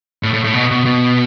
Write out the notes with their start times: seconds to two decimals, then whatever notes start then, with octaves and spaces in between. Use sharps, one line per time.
0.23 A2
0.33 A2
0.44 A2
0.54 B2
0.71 B2
0.85 B2